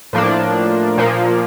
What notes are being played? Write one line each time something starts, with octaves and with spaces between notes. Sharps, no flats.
A2 F3 A#3 D4
A#2 F3 A#3